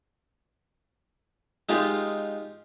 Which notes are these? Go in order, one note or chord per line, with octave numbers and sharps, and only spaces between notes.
G#3 D#4 F4 G4 A#4